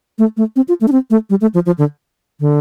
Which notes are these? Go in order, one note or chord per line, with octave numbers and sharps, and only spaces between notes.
A3
A3
C4
F4
A3
D4
C4
A3
G3
A3
F3
F3
D3
D3